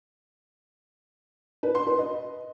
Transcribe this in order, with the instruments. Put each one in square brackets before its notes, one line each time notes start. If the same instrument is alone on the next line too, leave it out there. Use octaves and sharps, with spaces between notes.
[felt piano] B4
C6
B4
D#5